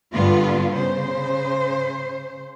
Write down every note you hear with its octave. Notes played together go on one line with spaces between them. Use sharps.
G2 D3 B3 F4
C#3 C5